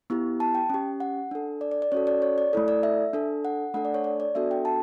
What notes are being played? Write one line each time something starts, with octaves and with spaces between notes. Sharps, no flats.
B3 E4 G4
A5
G5
C#4 G4
F#5
D4 A4
D5
D5
D5
C#4 F#4 A4 C#5
D5
C#5
D5
A3 E4 A4
D5
E5
D4 A4
F#5
A3 D4 A4 F#5
D5
C#5
D5
D5
B3 D4 F#4 A4 E5
G5
A5